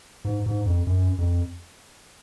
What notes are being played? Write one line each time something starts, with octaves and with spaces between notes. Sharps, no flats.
G#2
G#2
F2
F#2
F2